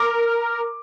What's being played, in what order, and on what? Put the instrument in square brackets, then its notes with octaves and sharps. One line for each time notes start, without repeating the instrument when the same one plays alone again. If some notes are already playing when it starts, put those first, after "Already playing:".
Already playing: [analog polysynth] A#4 [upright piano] D6